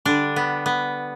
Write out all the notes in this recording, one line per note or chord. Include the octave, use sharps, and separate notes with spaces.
D3 G3 D4
B3
B3